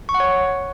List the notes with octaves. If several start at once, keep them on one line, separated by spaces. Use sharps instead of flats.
C#6
F#5
C#5